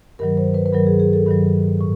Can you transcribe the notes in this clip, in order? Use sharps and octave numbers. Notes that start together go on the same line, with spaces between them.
G2 D#3 F#3 A#4
C5
B4
B4
G2 D#3 F#3 A#4
G#4
G#4
A4
G2 D#3 F#3
A2